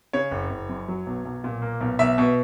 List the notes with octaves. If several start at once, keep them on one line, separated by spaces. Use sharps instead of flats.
C#3 C#5
F#1
F#1
F#2
F#3
B1
B1
A#2
A#3
B1
B1 E5
B2